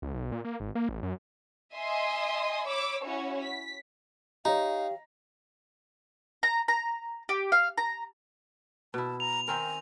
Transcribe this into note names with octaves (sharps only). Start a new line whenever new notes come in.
C#2
B1
A#2
A#3
G#1
A#3
A1
F#2
D#5 E5 G#5 C6 D#6
C#5 B5 D6 E6
C#4 E4 F#4 C#5
B6
D#4 G4 C#5 F5 A#5
A#5
A#5
G4
F5
A#5
B2 E4 A5
A#5 F7
D#3 C4 A#4 G#5